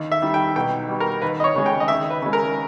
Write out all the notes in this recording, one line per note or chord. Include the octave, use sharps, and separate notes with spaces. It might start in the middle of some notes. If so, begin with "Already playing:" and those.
Already playing: D#2
E5
D#3 G3
G5
B1 G5
B2 G3
A#4
D#2 B4
D#5
C#5
C#3 G#3
G5
D#5
D#2 E5
B4
C#3 G#3
A#4